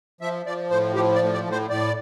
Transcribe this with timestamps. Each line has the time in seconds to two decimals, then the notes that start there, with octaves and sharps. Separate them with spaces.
0.21 F3 E5
0.46 F3 D5
0.70 A2 C5
0.95 F3 G4
1.15 D5
1.21 A2
1.33 D5
1.46 A2
1.52 C5
1.70 A2 D5